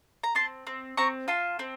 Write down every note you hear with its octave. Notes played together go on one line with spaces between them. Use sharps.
A#5
C4 A5 C6
C4
C4 A#5 C#6
F4 A5 C6
C4